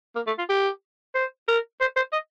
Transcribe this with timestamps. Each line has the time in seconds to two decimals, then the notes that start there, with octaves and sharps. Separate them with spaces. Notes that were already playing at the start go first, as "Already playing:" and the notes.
0.16 A#3
0.27 A3
0.39 F4
0.49 G4
1.15 C5
1.48 A#4
1.81 C5
1.96 C5
2.13 D#5